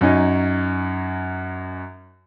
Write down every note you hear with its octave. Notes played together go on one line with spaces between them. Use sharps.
F#2 C#4 D#4